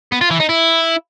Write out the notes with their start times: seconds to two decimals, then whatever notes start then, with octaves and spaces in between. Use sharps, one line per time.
0.12 B3
0.21 F4
0.31 E3
0.40 D#4
0.49 E4